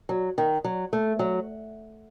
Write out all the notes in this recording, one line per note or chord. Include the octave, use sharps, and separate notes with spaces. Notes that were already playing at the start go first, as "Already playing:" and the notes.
F#3
D#3
F#3
A3
F#3